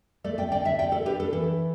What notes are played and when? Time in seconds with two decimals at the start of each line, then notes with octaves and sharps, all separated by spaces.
0.24 A3 A4 D5
0.38 D5 G5
0.51 D3 D5 G5
0.65 E5 A5
0.79 D3 D5 G5
0.92 A4 D5
1.05 D4 G4 B4
1.20 A4
1.33 E3 A4